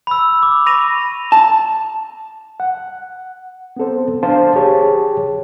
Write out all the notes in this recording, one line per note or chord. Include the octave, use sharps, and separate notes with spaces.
B5 E6
D6
B5 C#6 A#6 D#7 F7
A5
F#5
B3 C4 A4 C5
D4 C5 F5 A5
G4 G#4 C#5 A5